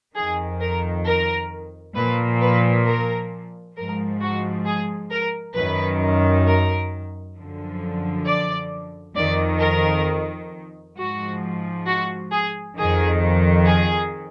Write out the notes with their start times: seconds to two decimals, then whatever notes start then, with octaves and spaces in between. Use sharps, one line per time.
0.15 F2 D#3 G#4
0.60 A#4
1.06 A#4
1.95 A#2 F3 B4
2.41 B4
2.85 A#4
3.76 G#2 F3 A#4
4.20 F#4
4.65 G#4
5.11 A#4
5.55 F#2 D#3 B4
6.46 A#4
7.36 F#2 D3 F3
8.27 D5
9.16 F2 D#3 D5
9.61 A#4
10.96 G#2 F3 F#4
11.87 F#4
12.32 G#4
12.76 F2 D#3 G#4
13.66 G#4